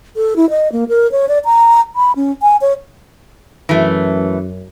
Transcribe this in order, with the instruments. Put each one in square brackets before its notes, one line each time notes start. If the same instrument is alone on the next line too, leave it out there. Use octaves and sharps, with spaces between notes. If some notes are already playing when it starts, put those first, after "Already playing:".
[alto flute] A4
E4
D#5
A#3
A#4
C#5
D5
A#5
B5
C#4
G#5
C#5
[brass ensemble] F#2 [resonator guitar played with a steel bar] E3 A3